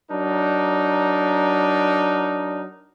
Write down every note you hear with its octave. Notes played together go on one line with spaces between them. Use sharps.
F#3 D4 D#4 A#4